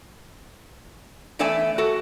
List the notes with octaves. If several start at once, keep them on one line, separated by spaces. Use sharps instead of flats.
E2 A3 A4 D5 E5 G#5
F#4 A4